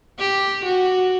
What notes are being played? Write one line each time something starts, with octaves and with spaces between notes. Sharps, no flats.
G4
F#4